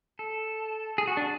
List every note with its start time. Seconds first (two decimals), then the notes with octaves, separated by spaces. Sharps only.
0.19 A4
0.98 G#4
1.07 F#4
1.17 D4